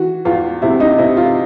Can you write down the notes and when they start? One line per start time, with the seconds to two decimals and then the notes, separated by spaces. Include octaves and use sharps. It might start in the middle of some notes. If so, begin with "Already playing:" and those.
Already playing: E3 F#4
0.25 E2 F4
0.62 C3 E4
0.80 D#4
0.98 C3 E4
1.17 F4